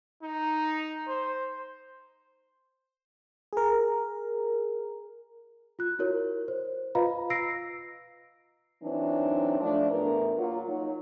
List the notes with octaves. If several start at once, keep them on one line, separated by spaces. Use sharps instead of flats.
D#4
C5
G#4 A#4
F4 F#6
E4 F#4 A#4 C#5
C5
F4 B4 D#5 F5 A#5 B5
E6 A#6 C7 D7
E3 F#3 C4 D4 D#4
F3 A3 D4
E2 A2 A#4 B4
F#3 A#3 F4
F#3 D#4